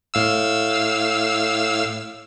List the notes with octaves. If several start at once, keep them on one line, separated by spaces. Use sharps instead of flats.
A2 F5 E6